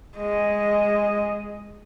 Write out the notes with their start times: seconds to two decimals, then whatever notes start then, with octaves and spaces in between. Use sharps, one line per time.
0.17 G#3 D#5